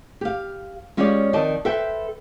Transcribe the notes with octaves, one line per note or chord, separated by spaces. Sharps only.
G4 F5
G#3 C#4 F4 G4 C#5 D5
F2 D#3 D5 D#5 A5
A4 B4 C5 E5 G5